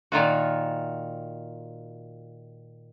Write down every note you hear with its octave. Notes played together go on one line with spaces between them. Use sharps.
A#2 D#3 F4 F#4